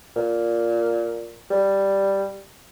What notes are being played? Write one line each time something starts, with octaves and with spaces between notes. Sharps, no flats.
A#2
G3